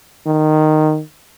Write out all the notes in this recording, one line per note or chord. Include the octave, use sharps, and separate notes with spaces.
D#3